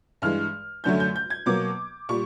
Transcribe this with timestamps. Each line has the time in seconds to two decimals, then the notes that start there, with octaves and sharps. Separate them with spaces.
0.22 G2 E3 G#3 F6
0.84 F#2 D3 F#3 A3 G6
1.00 G6
1.16 G6
1.30 G#6
1.46 B2 F#3 A#3 D6
2.09 A#2 G3 C#6